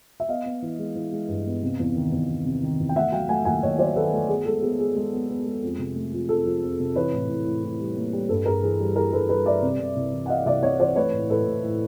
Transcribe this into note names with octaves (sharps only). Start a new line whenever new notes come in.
E5
B3 D#5 F5
B3
E3
G#3
E3
G#3
G2
B3
C3
E2
D#3
E2
E2
C3
D#3
E2
G5
A3 E5 F#5
F#3 F5 G5
A3 F#5 G#5
D#2 F#5 G#5
D#2 C#5 D#5
F#3 C5 D5
D#3 A4 B4
A3 A4
B3 G#4
G#3 A4
B3 G#4
G#3 G#4
G#3
B3
B3
G#3
F2
C3
A3
F3
F2 A4
F3
F2
C3
E3 B4 C#5
A2
A2
A2
A2
G3
A#3
G3
G2 A4 B4
G2 G#4 A#4
E3 G#4
G3
E3 G#4 A#4
G2 A4 B4
G3 A4 B4
G3 D5 E5
C3
C3
C2
E3
F#5
E3 D#5 F5
C2 D5 E5
C3 C#5 D#5
E3 C5 D5
A3 B4 C#5
A2
A2 A4 B4
A2
A2